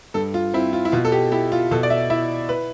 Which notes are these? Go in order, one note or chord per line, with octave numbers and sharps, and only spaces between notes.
G2 A4
F4
C4 E4
F4
E4
B2 F4
A4
G4
E4 G4
F4
B2 A4
D5
E5
E4 E5
B4